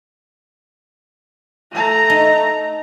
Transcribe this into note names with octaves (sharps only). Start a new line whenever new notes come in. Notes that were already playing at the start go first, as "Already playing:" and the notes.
A3 A#5
D#4